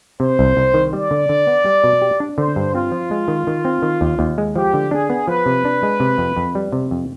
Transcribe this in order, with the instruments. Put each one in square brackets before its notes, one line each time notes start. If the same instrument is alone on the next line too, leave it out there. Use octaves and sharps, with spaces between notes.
[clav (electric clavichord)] C3 [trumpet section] C5
[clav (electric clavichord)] C2
C2
D#3
[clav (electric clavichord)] G3 [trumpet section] D5
[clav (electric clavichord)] D3
D3
B3
G3
B2
G4
D4
[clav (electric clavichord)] D3 [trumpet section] C5
[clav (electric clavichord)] G2
[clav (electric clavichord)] C4 [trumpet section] F4
[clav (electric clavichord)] F3
G#3
D#3
D#3
C4
D#3
D#2
D#2
G#3
[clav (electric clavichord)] F3 [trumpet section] G4
[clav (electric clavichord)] D3
[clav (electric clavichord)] D4 [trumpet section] G#4
[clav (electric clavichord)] B3
[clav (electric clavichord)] F3 [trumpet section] B4
[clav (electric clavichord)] C3
D4
G#3
C3
F2
F2
G3
C3
F2